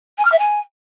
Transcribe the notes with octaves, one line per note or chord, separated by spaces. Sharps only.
G#5
F6
E5
G#5